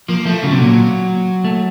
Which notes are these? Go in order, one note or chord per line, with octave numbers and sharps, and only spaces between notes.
F3 A#3
F3 A3
C#3 F#3
C3
A#2
A3